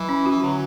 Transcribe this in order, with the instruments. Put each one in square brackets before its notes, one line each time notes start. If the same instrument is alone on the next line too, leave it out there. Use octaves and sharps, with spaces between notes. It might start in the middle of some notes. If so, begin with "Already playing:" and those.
Already playing: [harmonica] E3 [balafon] F#3
[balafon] C#4
[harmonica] E3 [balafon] F#4
[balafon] D3 [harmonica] F#3